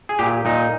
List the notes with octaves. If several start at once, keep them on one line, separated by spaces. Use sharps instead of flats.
G#4
A#2 G4
A#2 D#4